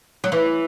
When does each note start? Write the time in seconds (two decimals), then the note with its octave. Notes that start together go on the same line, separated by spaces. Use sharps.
0.24 F#3
0.32 E3